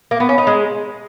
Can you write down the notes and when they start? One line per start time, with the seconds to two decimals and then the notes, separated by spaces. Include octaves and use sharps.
0.11 A#3
0.20 B3
0.29 C#4
0.38 D#4
0.47 G#3